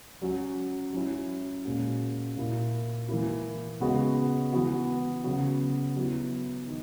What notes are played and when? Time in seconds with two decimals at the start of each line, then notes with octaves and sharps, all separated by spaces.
0.22 F#3 C#4 F#4
0.93 F#3 C#4 E4
1.65 A#2 G#3 C#4 F#4
2.37 A#2 A#3 E4
3.09 E3 A#3 E4
3.80 C#3 G#3 B3 F#4
4.53 E3 B3 F#4
5.24 C#3 F#3 B3 F#4
5.96 F#3 B3 E4
6.68 D#3